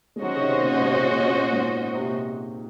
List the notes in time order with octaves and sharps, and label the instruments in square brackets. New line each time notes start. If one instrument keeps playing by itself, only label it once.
[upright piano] G#3
[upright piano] D#3 F#3 [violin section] C#4 F#4 C5 D#5
[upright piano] C#3
C3 D#3
A#2 C#3
G#2 C3
A#2 C#3
A#2 C#3
A#2
A#2
G#2
A#2
C3
A#2